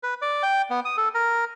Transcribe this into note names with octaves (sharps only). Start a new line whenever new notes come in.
B4
D5
G5
B3
D#6
A4
A#4